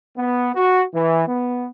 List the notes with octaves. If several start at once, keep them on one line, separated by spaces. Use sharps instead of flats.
B3
F#4
E3
B3